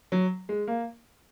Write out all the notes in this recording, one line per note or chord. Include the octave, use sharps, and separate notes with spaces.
F#3
G#3
A#3